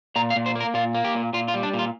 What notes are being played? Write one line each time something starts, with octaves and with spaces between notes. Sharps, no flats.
A#2 A#5
F5
A#2
C5
A#3
A#4
A#2 F4
A#3
G4
A#2
A#2 F4
F4
G3
D4
A#2
F4